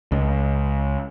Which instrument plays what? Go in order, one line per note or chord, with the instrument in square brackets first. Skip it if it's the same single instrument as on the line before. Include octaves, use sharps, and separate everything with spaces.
[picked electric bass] C#2